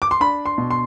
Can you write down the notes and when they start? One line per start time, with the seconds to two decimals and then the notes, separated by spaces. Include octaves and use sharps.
0.02 D6
0.11 C6
0.21 D4 B5
0.46 C6
0.58 B2
0.70 C6